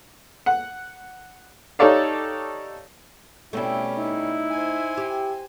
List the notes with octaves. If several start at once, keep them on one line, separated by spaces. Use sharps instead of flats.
F#5
D#4 G4 A4 C#5 D5 F5
B2 G3 A3 C4 C#4 E4
D#4 E4
C5 G#5
G4